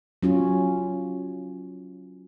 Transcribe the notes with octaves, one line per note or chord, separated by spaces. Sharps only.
F#3 C#4 F4